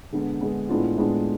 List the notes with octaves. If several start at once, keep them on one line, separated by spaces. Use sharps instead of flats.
D3 G#3 B3
D3 G#3 B3
A2 G#3 B3 D4 F4
A2 G#3 B3 D4 F4